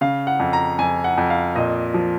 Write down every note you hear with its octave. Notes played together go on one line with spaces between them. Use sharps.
C#3 F5
F#5
F2
A#5
F2 G#5
F#5
F2
F5
A#2 D#5
F3